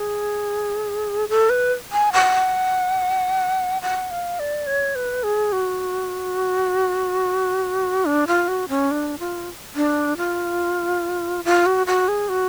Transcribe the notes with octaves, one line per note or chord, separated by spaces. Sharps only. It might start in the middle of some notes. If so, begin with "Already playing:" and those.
Already playing: G#4
A4
B4
G#5
F#5
F#5
F5
D5
C#5
B4
G#4
F#4
D4
F4
F#4
C#4
D4
F4
D4
F4
F4
F#4
F#4
G#4
F#4